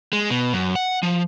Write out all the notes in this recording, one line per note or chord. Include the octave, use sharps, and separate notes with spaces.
G#3
B2
F#2
F#5
F3